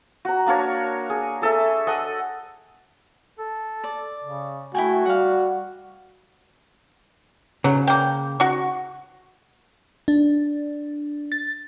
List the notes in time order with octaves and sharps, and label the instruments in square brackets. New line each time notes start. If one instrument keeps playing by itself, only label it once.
[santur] F#4 A#5
A#3 D4 A#4 C#5
G#4
G#4 A4 E5
A4 D#5 F#5 G#5
[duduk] A4
[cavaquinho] D5
[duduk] C#3
[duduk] A3 [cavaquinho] E4 G5 G#5 [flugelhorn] F#4
[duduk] G3 [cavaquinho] F5 F#5
[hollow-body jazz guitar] C#3 [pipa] F#3
[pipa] A#3 G5
F#4 C#6
[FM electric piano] D4
A6